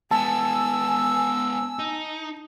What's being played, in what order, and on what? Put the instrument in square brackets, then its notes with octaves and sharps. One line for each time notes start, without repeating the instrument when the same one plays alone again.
[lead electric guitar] G#3 B3 [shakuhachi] G#5 [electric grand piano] A5 [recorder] E6
[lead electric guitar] D#4